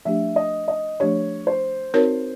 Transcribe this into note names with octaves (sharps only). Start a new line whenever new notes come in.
F3 A3 D4 G4 E5
D#5
D#5
F3 A3 D4 G4 C#5
C5
C4 D#4 F#4 A#4 C#5